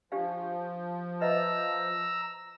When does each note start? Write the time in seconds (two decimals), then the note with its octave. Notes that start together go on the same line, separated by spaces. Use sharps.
0.12 F3 D4 G4 F5
1.21 B4 D#5 E5 A#5 E6